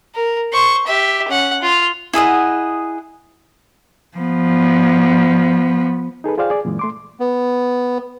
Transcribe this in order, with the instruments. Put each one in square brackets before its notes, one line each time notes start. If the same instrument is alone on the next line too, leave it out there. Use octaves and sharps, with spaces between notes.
[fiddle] A#4
C5 C#6
G4 E5
C#4 F#5
F4 F6
[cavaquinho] E4 G#4 D#5 F#5
[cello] F3 B3
[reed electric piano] D#4 G#4 A4 B4
F4 G#4 C5 D5 F5 G5
G#4 D5
F#2 A#2 E3 G#3
A3 C6 D6
[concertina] B3